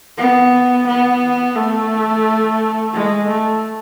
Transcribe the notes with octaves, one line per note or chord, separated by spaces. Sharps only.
B3
B3
A3
G#3
A3